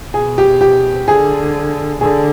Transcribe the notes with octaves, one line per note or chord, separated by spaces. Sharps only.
B2 G#4
G4
G4
D3 G#4
D3 G#4